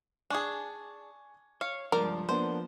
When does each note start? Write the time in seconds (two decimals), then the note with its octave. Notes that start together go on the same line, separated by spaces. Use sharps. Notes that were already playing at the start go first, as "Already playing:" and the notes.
0.30 D4 G#4 G#5 C#6 G#6
1.61 C#5 F5
1.92 C#2 G2 F3 A#4 D5
2.29 A#3 B3 D4 C5